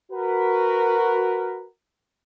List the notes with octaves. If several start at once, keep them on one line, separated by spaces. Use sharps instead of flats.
F#4 A#4 B4